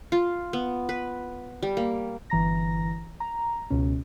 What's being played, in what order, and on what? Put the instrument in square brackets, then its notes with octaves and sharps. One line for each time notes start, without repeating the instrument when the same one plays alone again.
[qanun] F4
B3
B4
G3
A#3
[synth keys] G1 E3 A#5 A#6
A#5
C#2 B2 C#4